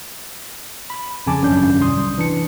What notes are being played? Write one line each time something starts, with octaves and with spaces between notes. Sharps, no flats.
B5
F2 C#3 G#5 A5 D6
G#1 F#2 C#4 D4 D5 G6
C2 C6 D#6
E3 D4 C#7